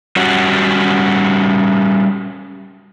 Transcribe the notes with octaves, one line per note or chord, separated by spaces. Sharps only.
G3 C#4 F#4